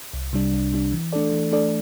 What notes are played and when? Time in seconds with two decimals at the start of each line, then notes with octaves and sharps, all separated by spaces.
0.14 C2
0.33 C3 G3 D4
0.53 C2
0.72 C3 G3 D4
0.93 E3
1.12 A3 D4 A4 D5
1.33 E3
1.52 A3 D4 A4 D5